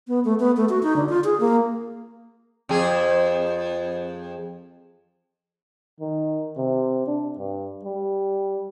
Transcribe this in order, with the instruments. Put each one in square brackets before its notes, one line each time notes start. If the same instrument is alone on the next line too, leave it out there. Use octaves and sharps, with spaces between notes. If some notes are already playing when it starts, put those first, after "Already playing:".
[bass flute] B3
A3
B3
A3
F#4
D#4
D3
F4
G#4
A#3
[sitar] F2 G#4
[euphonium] D#3
C3
D4
G2
G3